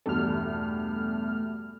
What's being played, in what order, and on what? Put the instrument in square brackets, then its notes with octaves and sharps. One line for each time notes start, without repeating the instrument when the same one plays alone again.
[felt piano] E2 G2 B2 [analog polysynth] A3 F6